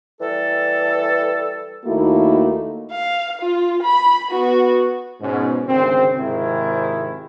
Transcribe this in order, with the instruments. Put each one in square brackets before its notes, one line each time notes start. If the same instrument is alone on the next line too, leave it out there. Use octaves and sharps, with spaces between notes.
[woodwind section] E3 G3 A4
[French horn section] D#2 A3 A#3 D#4 E4 F#4
[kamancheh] F5
F4
B5
B3 F#4
[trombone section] G#2 B2 C#4
G#1 D2 C#3 C4
G#1 G#2 C3 D#3 G#3 E4